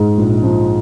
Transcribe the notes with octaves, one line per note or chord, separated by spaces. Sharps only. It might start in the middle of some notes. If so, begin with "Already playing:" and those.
Already playing: G#2 G#3
A#1
F3